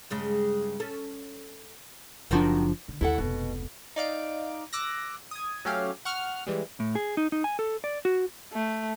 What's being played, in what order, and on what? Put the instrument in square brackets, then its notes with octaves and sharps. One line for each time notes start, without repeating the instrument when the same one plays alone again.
[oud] G2 C#3 G#3
C#4 A4
[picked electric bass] F#1 F3 D4 [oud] D#3 C4 F#4
[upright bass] D3
[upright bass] D#2 [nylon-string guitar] E4 A4 F#5
[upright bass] F1 C#2 [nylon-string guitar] B2
[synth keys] D#4 D5 F5 D7
D6 E6 F#6 A#6
D#6 G#6
F#3 A3 C#4 G4 F5
F#5 C#6 F6
E3 G3 G#3
[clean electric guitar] A2
G#4
D#4
D#4
G#5
A4
D5
F#4
[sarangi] A3